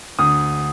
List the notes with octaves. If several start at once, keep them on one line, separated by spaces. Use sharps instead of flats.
D2 D#6